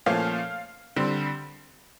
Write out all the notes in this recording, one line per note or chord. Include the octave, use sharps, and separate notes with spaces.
A#2 F3 A3 C#4 F5
D3 G3 C4